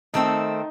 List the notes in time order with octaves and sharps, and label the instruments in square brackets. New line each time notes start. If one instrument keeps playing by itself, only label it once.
[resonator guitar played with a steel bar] D#3 A3 C4 [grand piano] D#4